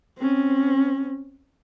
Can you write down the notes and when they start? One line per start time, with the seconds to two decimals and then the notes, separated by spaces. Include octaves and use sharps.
0.18 C4 C#4